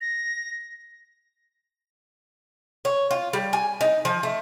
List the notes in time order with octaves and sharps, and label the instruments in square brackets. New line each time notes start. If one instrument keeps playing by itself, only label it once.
[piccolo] A#6
[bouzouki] C#5
F4
G3
G#5
D#4
F3
A3